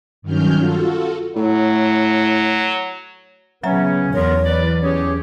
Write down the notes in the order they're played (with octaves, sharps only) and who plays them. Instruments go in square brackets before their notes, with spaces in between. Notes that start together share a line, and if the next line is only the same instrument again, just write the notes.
[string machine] G2 D#3 F#3 C#4 F6 G6
F4 F#4 A4
[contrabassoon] A2 [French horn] F#3
[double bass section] C#3 B3 [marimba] F#3 E5 A#5 [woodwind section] C#4
[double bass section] E2 [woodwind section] B3 F4 A#4 [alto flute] C#5
[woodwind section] B4 D5
[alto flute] C#4 [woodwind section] G4 G#4 C#5